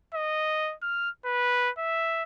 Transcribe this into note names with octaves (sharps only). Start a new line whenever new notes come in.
D#5
F6
B4
E5